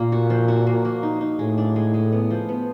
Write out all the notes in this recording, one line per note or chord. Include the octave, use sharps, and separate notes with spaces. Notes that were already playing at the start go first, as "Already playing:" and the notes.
Already playing: A#2 A#3
F#4
F3
F#4
A#3
A#3
D#4
D#4
A2 G#3
D4
G#3
G#3
B3
F3
B3